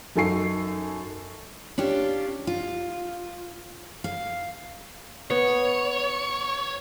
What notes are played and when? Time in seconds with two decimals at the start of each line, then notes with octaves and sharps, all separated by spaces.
0.16 F#2 D#4 A4 G#5 C#6 C7
1.78 C#4 D4 F4 G4
2.47 F4
4.04 F5
5.31 B3 C#5